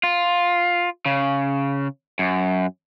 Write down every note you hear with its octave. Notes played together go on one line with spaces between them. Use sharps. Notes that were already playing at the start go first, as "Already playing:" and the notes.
F4
C#3
F#2